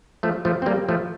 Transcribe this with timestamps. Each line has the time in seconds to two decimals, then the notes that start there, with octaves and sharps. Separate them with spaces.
0.23 F3 A3
0.45 F3 A3
0.62 C4
0.66 G3 A#3
0.89 F3 A3